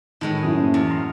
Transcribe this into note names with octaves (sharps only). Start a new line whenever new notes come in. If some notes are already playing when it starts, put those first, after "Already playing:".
A2 D#3 G#3 C#5
F#2 E4 D#6
A#3 C#4 C5
E2
A#5 C6 F6